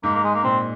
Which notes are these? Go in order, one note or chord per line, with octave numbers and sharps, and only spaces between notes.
G#2 A#3
A#3
G#3
A#3
A#2 C4